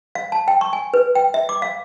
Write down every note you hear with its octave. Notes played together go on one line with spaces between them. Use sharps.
F5
A5
G5
C#6
G#5
B4
G5
E5
D6
F5